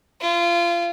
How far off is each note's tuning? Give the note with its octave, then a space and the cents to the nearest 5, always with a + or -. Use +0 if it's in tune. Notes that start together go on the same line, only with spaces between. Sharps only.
F4 -25